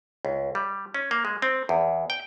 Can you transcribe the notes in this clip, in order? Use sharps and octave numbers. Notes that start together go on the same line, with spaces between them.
C#2
G3
C#4
A#3
G#3
C4
E2
G5